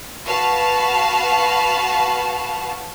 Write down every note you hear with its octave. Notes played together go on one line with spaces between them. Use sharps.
F#4 B4 F5 A5